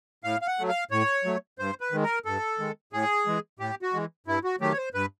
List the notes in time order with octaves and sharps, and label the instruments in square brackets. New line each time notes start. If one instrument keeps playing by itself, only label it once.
[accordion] A2 F5
F5
F#5
F#3 A3
F5
A2 C#5
F#3 A3
G2 C5
B4
D#3 G#3
A#4
G2 A4
D#3 G#3
A2 G#4
E3 G#3
A2 G4
F#4
E3 G#3
G2 E4
F#4
D#3 F#3 A3 G4
C#5
C5
G2 B4